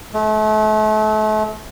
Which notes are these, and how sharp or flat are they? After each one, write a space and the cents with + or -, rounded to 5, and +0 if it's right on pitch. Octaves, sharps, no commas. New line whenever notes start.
A3 -35